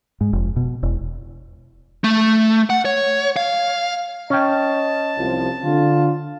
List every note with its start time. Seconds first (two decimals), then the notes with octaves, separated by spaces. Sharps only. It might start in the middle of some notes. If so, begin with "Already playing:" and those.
0.21 G#2
0.33 F1
0.56 B2
0.83 E1
2.04 A3
2.70 F#5
2.85 C#5
3.36 F5
4.30 C#4 D#5 G5 A5
5.18 C2 F3
5.64 D3 F4